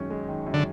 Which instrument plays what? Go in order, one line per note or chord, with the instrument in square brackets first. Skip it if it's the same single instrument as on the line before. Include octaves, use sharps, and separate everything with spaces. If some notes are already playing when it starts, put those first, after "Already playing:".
Already playing: [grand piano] F#2 D#3 G#3 C#4
G#3
D#3
F#2
[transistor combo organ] D3